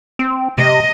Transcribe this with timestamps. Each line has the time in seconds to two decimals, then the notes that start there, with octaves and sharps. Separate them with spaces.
0.19 C4
0.58 C3 D#5